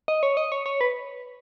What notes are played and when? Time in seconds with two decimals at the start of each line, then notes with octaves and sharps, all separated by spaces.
0.08 D#5
0.23 C#5
0.37 D#5
0.52 C#5
0.66 C#5
0.81 B4